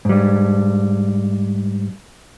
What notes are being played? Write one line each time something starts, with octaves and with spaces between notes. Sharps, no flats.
G#2 G3